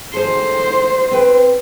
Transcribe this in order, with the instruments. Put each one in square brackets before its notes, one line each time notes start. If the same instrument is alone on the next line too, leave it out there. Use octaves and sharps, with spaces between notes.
[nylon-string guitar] G#4 A4 [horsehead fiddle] C5
[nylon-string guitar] C4 B4 G5